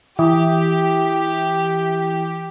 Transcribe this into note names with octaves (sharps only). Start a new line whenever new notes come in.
E3 E4 G4 G5 D#6